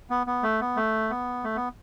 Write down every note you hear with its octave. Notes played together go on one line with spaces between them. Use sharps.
B3
B3
A3
B3
A3
B3
A3
B3